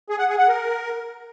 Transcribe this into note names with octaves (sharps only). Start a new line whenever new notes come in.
G#4
F#5
G#4
F#5
A#4